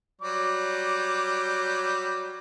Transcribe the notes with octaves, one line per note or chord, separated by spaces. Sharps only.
F#3 G3 D6